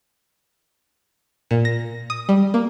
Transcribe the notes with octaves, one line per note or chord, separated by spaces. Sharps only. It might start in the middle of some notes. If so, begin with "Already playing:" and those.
A#2
A#6
D#6
G3
A#3